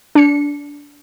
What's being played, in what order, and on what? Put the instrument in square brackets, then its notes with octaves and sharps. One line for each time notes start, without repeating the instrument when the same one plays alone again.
[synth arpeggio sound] D4 C#7